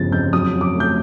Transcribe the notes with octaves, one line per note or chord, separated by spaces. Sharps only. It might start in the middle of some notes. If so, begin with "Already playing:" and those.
Already playing: G1 E2 C#3 F3 A6
F2 G6
F#2 D#6
F#3
D6
A3
G6